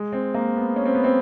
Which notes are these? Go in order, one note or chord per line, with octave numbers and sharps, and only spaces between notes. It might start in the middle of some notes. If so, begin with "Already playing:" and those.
Already playing: G#3
C4
A#3
B3
C#4
C4
B3
C4